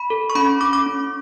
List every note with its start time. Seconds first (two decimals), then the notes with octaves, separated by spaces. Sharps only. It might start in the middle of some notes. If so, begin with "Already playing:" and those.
Already playing: B5
0.10 A4
0.30 C#6
0.35 C#4 B5
0.61 C#4 D6
0.73 D6
0.86 C#4